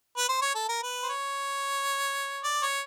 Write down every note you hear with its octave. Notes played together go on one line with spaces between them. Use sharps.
B4
C5
C#5
A4
A#4
B4
C5
C#5
D5
C#5